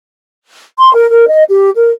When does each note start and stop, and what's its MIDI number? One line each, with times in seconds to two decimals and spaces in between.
0.78 0.91 84
0.94 1.09 70
1.09 1.26 70
1.28 1.44 75
1.49 1.70 67
1.76 1.90 70